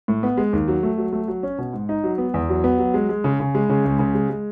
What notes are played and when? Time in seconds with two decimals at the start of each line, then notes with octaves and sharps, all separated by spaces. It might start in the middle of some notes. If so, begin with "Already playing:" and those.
0.08 A2
0.23 B3
0.37 G#3
0.53 D#2
0.68 F#3
0.83 A3
0.98 F#3
1.13 A3
1.28 F#3
1.43 C#4
1.58 B2
1.73 G#2
1.89 D#4
2.04 F#3
2.18 B3
2.34 E2
2.49 F#3
2.64 B3
2.79 F#3
2.94 G#3
3.09 G#3
3.24 C#3
3.40 C#3
3.55 G#3
3.69 C#3
3.85 C#2
3.99 C#3
4.15 G#3
4.29 G#3